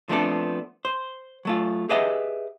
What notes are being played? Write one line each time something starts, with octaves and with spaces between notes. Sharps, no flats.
F3 A3 B3 C4 D4 A4
C5
F#3 A3 F4
G4 G#4 B4 D#5 E5 F#5